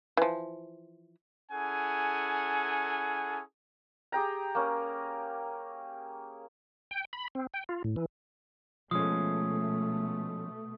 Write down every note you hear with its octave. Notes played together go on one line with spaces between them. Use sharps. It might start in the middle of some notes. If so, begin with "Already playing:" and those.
E3 F3
C#4 E4 G#4 A4 F#5 G#5
G4 G#4 G5 A#5
A#3 C#4
G5
B5
C4
G5
F4
A2
E3
B2 F3 G#3 A3 C#4 D#6